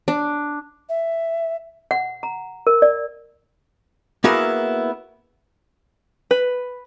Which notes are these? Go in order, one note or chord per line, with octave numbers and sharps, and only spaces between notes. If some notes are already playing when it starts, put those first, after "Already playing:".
D4
E5
F#5
A#5
A#4
D5
A#3 B3 E4 F#4 G#4 A#4
B4